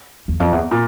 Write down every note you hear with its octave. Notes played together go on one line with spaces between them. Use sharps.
E2
F2
E2
A#2